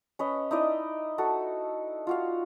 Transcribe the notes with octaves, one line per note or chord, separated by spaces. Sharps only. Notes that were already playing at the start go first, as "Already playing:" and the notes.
C#4 B4 D#5
D#4 E4 D5 D#5
F#4 A4
F4 F#4 F5